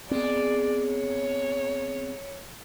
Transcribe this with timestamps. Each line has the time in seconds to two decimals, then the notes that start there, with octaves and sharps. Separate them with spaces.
0.11 G#3 B3 C4 G#4 D5
0.87 C#5